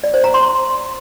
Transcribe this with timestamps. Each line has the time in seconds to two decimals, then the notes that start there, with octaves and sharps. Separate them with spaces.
0.04 D5
0.14 C5
0.24 A#5
0.34 C6